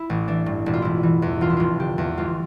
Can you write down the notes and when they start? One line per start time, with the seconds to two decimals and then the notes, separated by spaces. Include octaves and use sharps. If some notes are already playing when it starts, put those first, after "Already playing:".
Already playing: E4
0.10 A1
0.28 E3 D4
0.46 G2
0.66 E1 E4
0.73 F4
0.82 E1 E4
1.03 E3
1.22 E2
1.41 F1 F4
1.50 E4
1.57 F1 F4
1.80 D3 G4
1.98 E2
2.17 G1 F4